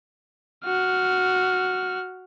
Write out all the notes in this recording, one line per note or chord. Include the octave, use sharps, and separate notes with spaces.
F#4 F6